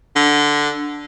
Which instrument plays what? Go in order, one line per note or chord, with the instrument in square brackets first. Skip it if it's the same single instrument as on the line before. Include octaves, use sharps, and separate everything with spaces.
[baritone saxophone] D3